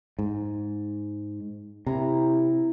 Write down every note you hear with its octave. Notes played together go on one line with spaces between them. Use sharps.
G#2
C3 E4 A#5